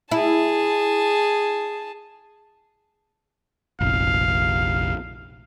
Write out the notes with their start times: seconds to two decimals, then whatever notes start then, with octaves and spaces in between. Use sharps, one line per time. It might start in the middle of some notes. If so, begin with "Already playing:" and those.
0.11 E4 G#4 A5
3.81 F1 A#1 F5